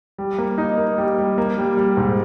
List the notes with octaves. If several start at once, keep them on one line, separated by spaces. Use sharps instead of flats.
G3
A#3
D#4
A#3
G3
G3
A#3
G3
G3
G#2